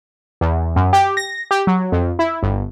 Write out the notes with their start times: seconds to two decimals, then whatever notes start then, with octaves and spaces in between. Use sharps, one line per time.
0.41 E2
0.76 F#2
0.93 G4
1.17 A#6
1.51 G4
1.67 F#3
1.92 F2
2.19 E4
2.43 G1